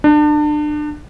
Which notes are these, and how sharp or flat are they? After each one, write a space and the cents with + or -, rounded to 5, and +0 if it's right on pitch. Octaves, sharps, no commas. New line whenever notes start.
D4 +30